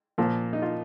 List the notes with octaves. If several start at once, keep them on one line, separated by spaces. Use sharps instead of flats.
A#2 F3 A#3
D#4
F4